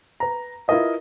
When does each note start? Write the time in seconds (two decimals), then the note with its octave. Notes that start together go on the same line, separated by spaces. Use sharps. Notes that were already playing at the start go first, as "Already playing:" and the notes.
0.20 B4 A#5
0.68 E4 F4 A#4 B4 D#5 E5